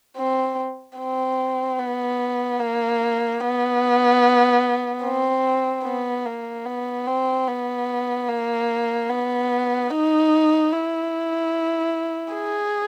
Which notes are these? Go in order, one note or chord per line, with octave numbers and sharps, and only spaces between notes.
C4
C4
B3
A#3
B3
C4
B3
A#3
B3
C4
B3
A#3
B3
D#4
E4
G#4